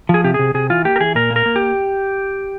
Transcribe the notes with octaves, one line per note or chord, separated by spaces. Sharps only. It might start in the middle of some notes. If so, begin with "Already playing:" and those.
F3 G#4
C3 G4
C3 G#4
C3 G#4
E3 F4
A#3 G4
A#4
E3 G#4
A#2 A#4
A#3
A#4
A#3
G4